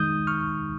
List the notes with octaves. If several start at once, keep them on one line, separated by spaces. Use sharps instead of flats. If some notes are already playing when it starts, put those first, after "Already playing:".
Already playing: D#3 G#3 D#4 D#6 G6
C#6 F6